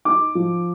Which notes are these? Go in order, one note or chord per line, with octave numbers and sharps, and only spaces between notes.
D#4 D6
F3